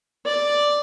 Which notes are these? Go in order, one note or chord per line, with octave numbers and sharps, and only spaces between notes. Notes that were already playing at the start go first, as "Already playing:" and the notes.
D5